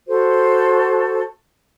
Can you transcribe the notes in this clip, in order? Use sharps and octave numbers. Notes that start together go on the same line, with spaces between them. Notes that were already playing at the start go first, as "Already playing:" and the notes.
F#4 A4 C5